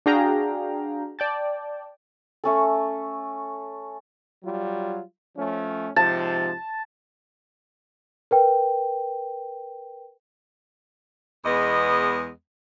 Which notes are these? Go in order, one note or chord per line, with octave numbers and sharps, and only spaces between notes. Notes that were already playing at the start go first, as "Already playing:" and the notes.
D4 F#4 G#4 F5 G5 A#5
D5 G5 A5
A3 C#4 A4
F#3 G3 F4
F3 A3 C#4
G#2 C3 F3 A5
A#4 B4 G5
E2 G#3 B3 D#5